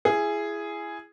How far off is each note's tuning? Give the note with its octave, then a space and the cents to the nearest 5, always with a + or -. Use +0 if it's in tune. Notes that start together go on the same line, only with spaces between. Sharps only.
E4 +25 G#4 +0